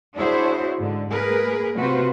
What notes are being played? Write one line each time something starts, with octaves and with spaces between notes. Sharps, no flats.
D4 E4 F#4 G#4 C5 C#5
G#2 D3
A#3 G#4 A#4 B4
C3 A#3 F4 F#4 B4 C5